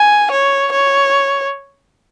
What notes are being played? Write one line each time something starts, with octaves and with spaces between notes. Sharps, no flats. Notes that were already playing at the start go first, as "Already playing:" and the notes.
Already playing: G#5
C#5
C#5